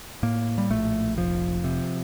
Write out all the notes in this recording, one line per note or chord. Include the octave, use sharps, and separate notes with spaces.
A2 A#3
G3
A#1 A3
F1 F3
C3